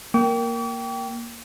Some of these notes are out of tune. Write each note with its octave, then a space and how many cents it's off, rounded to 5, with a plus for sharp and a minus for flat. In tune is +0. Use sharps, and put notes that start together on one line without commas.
A#3 +0 G5 -10 D6 -45